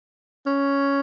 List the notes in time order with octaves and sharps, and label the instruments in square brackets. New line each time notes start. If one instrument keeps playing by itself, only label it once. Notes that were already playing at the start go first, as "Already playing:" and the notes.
[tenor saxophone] C#4